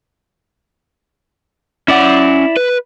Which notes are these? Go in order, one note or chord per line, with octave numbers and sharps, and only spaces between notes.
C#4 E4 D5 F#5
B4